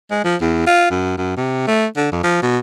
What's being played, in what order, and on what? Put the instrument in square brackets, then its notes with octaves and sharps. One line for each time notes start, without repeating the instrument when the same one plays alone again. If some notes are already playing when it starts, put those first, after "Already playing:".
[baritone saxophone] G#3
F3
E2
F4
F#2
F#2
C3
A3
D3
F2
F3
B2